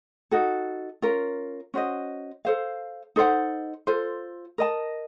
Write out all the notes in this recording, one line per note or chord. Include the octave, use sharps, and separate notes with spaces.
D#4 F#4 A4
C#4 F4 A#4
C#4 F#4 C5 D#5
A4 C5 F5
D#4 A4 C5 F#5
F4 A4 C5
A#4 D#5 A5